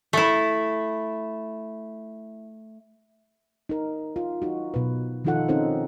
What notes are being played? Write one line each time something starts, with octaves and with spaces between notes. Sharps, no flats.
A3 E4
D#4 A#4
F4
D#4 F#4
B2 B4
D#3 F3 D#4 F4 A4 F#5
C4 C#4 D#4 A4 A#4 C5